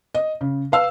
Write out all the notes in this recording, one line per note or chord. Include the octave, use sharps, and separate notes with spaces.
D#5
C#3
B4 F5 E6